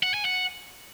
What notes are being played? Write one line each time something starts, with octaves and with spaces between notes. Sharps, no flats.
F#5
G#5
F#5